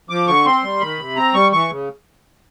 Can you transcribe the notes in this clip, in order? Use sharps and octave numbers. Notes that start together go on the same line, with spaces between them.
F3 D6
D3 C#6
C4 C6
G3
D#3 B5
C3
C4 A#5
G3 C#6
E3 C#6
C#3